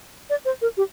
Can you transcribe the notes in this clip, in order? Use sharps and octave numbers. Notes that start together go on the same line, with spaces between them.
D5
C5
A#4
G4